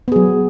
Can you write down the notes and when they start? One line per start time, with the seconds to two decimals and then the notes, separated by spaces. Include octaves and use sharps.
0.08 B3
0.12 G#4
0.16 F#3